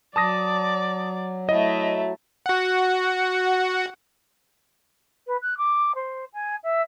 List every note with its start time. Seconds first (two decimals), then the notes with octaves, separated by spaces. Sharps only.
0.16 F#3 D5 A5 D#6 A#6
1.49 A3 E4 D#5
2.46 F#4 F#5
5.27 B4
5.42 F#6
5.57 D6
5.95 C5
6.33 G#5
6.64 E5